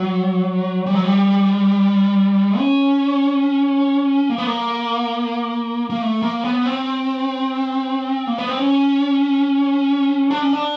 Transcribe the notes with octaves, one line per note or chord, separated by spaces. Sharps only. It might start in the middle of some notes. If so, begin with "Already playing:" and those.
Already playing: F#3
G3
F#3
G3
C#4
A#3
B3
A#3
A#3
A3
A#3
B3
C4
A#3
B3
C4
C#4
D4
C#4
D4